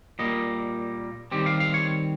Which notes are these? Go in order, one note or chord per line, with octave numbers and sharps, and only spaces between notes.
A#2 G3 A#3 D#5
D#3 G3 C4 G4
F5
F5
C#5